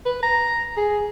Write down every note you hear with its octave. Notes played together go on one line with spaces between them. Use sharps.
B4
A#5
G#4